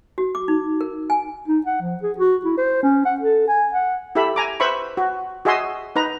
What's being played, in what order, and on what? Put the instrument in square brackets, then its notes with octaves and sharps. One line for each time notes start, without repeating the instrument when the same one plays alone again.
[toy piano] F#4
D6
D#4
A#4
G#5
[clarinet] D#4
F#5
F3
G#4
F#4
E4
C5
C#4
F#5
A4
G#5
F#5
[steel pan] E4 G4 A4 E5 B5
G#5 A#5 D6
B4 C5 E5 B5 C#6
F#4
F#4 G#4 D#5 E5 G#5 C6
D#4 B4 A#5